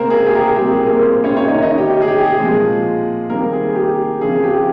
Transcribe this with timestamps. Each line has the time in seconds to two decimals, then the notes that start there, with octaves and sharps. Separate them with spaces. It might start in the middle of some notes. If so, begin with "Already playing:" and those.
Already playing: C#3 G#3 A#3 C4 A#4 C5
0.10 G#4
0.26 G4
0.35 A#4
0.41 G#4
0.56 A#2 G3 C4 G4
0.72 G#4
0.86 A#3 A#4
1.02 C4 C5
1.24 C#4 C#5
1.37 C#5
1.47 D#3 A#3 D#4 D#5
1.58 C#5
1.62 D#4 D#5
1.78 G4
1.92 G4
2.02 G#4
2.08 G4
2.24 G#4
2.38 A#2 F3 G#3 C4
3.30 D#3 G3 A#3 C4 A#4
3.53 G#4
3.75 G4
4.21 C#3 F3 C4 G#4
4.44 G4